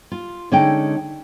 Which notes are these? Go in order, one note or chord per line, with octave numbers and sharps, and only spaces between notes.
F4
D3 G#3 C#4 D#4 A4 G5